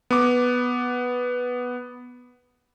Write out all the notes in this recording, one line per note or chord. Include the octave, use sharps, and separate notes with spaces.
B3 D6